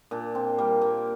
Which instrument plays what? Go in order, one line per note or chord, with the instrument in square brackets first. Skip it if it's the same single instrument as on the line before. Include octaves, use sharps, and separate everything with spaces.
[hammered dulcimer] A#2 D4
C4
G3 A#3
A#3